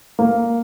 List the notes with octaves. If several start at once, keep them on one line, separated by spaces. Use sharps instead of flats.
A#3